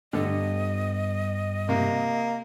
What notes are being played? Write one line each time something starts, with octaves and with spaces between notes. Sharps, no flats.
G2 D3 B3 G4 A4 D#5
C3 A#3